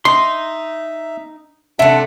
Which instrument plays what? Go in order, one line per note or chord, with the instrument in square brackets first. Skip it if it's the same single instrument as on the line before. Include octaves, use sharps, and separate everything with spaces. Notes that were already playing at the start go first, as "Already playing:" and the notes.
[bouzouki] D#4 [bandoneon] E5 [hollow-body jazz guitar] C6
[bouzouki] C3 A3 [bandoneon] D4 F#5 [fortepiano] E5